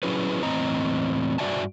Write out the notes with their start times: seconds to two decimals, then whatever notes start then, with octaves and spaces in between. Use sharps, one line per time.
0.03 F#3 C#4 E4 G#4 B4
0.43 E2 A2 C4 D#5 A#5
1.38 G2 F#4 D5 E5 G#5 A5